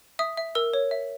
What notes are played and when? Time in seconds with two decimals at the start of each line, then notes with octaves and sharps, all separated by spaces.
0.19 E5 D#6
0.37 E5
0.55 A#4 E6
0.74 C#5
0.91 E5